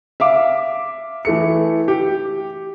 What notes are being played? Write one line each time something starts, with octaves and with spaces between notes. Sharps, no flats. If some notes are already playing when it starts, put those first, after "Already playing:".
E5 F5 D6
E3 A3 C#7
G4